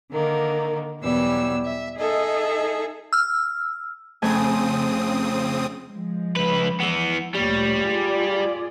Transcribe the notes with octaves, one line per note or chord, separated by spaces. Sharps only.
D3 D#3 A#3
E2 B2 E3 F#3 G3 E6
E5
D#4 G#4 A4 D#5 E5
E6 F6
F2 C#3 A3 C4 G#5 D#6
F3 G#3
C#2 B4
E3 B3
D2 A#2 G3 C#5
F4 G#4 D5